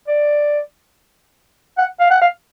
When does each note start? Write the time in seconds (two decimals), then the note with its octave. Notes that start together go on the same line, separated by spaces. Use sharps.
0.08 D5
1.78 F#5
2.00 F5
2.10 F#5
2.22 F5